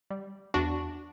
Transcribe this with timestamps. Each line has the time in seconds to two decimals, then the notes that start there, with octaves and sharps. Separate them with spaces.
0.10 G3
0.54 E2 D4 F#4